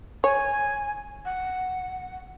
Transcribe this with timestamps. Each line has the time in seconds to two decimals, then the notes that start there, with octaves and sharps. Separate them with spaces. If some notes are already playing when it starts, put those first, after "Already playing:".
0.24 C#5 G#5
1.25 F#5